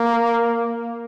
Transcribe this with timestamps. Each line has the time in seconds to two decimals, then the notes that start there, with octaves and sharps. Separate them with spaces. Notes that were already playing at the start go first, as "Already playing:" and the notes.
Already playing: A#3